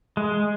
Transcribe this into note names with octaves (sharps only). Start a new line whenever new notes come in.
G#3